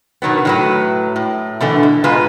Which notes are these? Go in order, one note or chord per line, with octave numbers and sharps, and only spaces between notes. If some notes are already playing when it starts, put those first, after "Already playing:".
B2 D#3 F#3 B3
A2 F#3 B4
A2
B2 D3 E3 A3
B2
G#2 B2 G#3 F4 B4